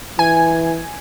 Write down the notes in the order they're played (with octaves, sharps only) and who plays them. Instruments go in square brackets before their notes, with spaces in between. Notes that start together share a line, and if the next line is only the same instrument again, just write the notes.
[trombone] E3 [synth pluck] G#5